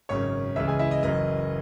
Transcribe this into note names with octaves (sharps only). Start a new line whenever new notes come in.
G#1 F#2 C#3 C#5 C#6
C#2 C#3 E3 E5 E6
G#4 G#5
E4 E5
D#5
F#1 F#2 E3 D#5